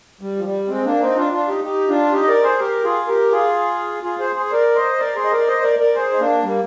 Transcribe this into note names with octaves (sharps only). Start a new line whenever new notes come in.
G3
F3
G3
G#3 C4
A#3 D4
C4 D#4
D4 F4
D4 F4
D#4 G4
D#4 G4
D4 F4
D#4 G4
D#5
A#4 D5
G#4 C5
G4 A#4
F4 G#4
G4 A#4
F4 G#4
F4 G#4
G#4 C5
G#4 C5
C5
A#4 D5
C5 D#5
A#4 D5
G#4 C5
D#5
A#4 D5
C5 D#5
C5
A#4 D5
A#4 D5
G#4 C5
D#4
A#3 D4
G3 A#3